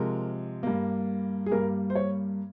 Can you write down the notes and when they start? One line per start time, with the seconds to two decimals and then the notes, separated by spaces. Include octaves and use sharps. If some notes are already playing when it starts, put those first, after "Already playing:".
Already playing: C3 F3 G#3 A#4
0.63 G2 G3 A#3
1.46 G#4
1.51 G2 G3 A#3 A#4
1.90 C5
1.95 C#5